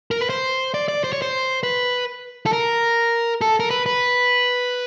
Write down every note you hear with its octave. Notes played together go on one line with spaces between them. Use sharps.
A#4
B4
C5
D5
D5
C5
C#5
C5
B4
A4
A#4
A4
A#4
B4
B4